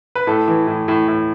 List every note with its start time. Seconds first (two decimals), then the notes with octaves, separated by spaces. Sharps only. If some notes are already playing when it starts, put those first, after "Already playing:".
0.15 B4
0.27 A2 A4
0.48 E3
0.67 A2
0.88 A2
1.08 A2